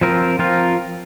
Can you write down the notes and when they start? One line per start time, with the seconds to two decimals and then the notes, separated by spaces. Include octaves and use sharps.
0.01 F3 C4 F4 A#4
0.39 F3 C4 F4 A#4